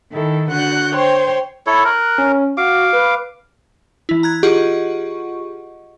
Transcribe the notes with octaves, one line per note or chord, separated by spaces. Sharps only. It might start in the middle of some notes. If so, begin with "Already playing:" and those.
D#3 E4 A4
D3 F#4 F#5 F#6 G6
C5 C#5 G5 C6
E4 A4 C#5
A#4 F#6
C#4
F#4 F5 D6
B4
E3 E4
A#5 F#6 G#6
F4 G4 G#4 D#5 F#5 C#6